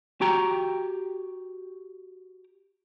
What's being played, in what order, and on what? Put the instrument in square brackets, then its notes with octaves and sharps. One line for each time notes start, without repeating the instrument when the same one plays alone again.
[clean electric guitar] F#4 G4 G5 A#5